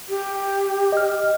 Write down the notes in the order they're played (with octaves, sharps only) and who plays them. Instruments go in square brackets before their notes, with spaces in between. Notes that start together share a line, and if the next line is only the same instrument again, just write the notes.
[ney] G4
[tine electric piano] D#5 F6